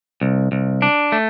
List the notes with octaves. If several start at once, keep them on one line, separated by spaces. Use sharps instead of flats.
C2
C2
D4
A3